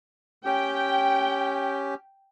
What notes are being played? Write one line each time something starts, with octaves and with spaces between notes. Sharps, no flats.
C#4 G4 G5